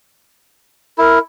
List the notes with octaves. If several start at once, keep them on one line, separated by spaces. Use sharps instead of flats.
E4 A#4